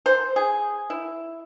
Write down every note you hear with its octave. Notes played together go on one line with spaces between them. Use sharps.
C5
G#4
E4